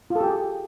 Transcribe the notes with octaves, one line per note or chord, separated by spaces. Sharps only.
F4
A4
G4
G#4